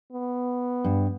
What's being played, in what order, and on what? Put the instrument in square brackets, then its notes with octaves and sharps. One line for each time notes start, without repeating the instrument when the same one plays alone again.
[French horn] B3
[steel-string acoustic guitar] G2